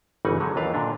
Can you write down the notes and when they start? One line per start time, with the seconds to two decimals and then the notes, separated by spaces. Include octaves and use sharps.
0.25 G1 C#3 E3 D#4 F#5 G#5
0.40 D3 F#3 G#3
0.56 D#2 E3 D4 B4 F5
0.74 A#2 D3 D4